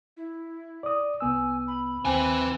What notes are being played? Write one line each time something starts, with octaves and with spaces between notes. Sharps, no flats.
E4
D5 D#6
C2 B3 G#5 E6
B5
D#2 C4 B4 G#5